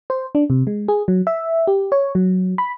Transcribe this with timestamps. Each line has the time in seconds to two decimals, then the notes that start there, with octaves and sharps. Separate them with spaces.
0.10 C5
0.35 D4
0.50 C3
0.67 G#3
0.88 G#4
1.08 F#3
1.27 E5
1.67 G4
1.92 C#5
2.15 F#3
2.58 B5